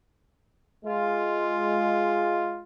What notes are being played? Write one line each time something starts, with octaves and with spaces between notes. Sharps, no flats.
G#3 F4